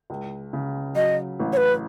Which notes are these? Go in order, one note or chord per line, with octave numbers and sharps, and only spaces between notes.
C#2
C#3
F#3 D#5
A1
C#5
B4